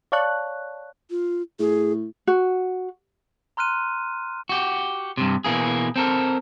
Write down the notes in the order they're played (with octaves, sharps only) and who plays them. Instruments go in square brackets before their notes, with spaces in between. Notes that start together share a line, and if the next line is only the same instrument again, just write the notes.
[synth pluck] C#5 D5 F5 A5 C#6 F#6
[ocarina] F4
[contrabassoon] A2 [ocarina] G#4
[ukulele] F#4
[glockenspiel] A#5 C6 F6 F#6 D#7
[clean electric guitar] F#4 G4
G2 C3
B2 E3 A#3 G#4
C4 A4 A#4